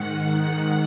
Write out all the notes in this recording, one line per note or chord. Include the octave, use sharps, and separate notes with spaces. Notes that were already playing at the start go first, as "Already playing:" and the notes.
Already playing: G#2 D#3 F#5